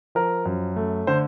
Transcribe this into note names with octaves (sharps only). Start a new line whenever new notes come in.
F3 A#4
F#2
A3
D3 C5